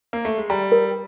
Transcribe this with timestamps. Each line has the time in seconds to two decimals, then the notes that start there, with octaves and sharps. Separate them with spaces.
0.13 A#3
0.25 A3
0.38 G#3
0.50 G3 A#5
0.72 A#4